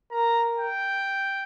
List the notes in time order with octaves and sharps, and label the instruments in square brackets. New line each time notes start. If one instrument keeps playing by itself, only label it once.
[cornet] A#4 [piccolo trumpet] A#5
[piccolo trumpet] G5